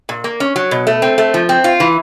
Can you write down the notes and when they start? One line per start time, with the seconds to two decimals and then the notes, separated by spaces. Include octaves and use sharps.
0.09 A#2
0.24 A#3
0.40 C#4
0.56 F#3
0.71 B2
0.87 A3
1.02 C4
1.18 A3
1.34 F3
1.49 C4
1.64 F4
1.80 E3